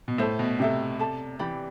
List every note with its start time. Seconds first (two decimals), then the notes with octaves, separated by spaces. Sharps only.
0.08 B2
0.18 A2 A4 C5 E5
0.39 B2
0.59 C3 A4 E5 G5
0.99 A4 D5 A5
1.39 E3 G4 D5 G5 B5